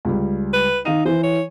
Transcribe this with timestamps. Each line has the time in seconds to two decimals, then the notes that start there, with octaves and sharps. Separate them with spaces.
0.05 C#2 G3
0.53 B4
0.85 D#3 D#4 F5 D#7
1.05 E3 C5
1.23 C#5